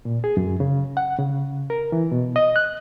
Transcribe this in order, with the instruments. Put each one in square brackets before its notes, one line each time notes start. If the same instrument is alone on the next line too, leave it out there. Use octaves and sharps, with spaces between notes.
[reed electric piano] A#2
G#4
F#2
C#3
F#5
C#3
A#4
E3
B2
D#5
F#6